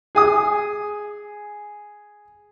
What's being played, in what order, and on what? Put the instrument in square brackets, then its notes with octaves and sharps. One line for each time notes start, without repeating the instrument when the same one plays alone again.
[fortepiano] G#4 G#5 D#6